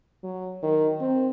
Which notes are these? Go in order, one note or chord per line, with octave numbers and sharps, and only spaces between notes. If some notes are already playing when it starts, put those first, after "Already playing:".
F#3
D#3
C4